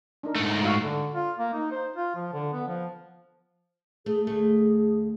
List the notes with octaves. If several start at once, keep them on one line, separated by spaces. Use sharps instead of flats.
D4 D#4 A#4
G#2 A3
A#5
F#4 F5 E6
D3
F4
A#3
D#4
C5
F4
F3
D3
B3
F3
A3 G#4
D2 A3 G#4